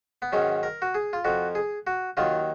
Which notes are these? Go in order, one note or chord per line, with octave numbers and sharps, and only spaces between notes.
B3
G#2 D#3 F#3 C#4
A#4
F#4
G#4
F4
F2 F3 F#4
G#4
F#4
D#2 D#3 F#3 F4